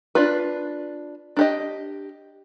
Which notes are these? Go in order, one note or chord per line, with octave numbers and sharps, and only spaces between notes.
D4 F4 B4
D4 G4 D#5